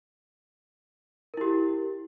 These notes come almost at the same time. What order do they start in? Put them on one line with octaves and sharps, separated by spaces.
A#4 E4 G4